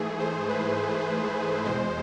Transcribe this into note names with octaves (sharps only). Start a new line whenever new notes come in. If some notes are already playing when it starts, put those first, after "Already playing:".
Already playing: G#2 E3 A3 G#4
C5
B4
E2 B2 G#3 C5